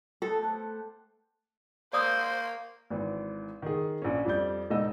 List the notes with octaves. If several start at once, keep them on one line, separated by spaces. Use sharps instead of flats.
A3 B3 A4 A5
G4 C5 F#5
A#3 C5 D5 D#6 E6
G#1 E3
D#3 G#4
A#1 C#4
F2 G3 D5 G6
E1 G#2 D#4 D#5 E6